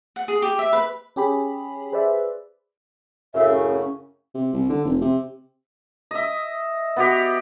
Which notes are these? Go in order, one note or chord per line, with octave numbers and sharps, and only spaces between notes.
F#5
G#4
G4
E5
B4
C#4 G4 G#4 B5
G#4 B4 C5 D5 E5
F#2 A2 C#3 E5
C#4
C#4
C3
C2
D3
F1
C3
D#5 E5
B3 F#4 G4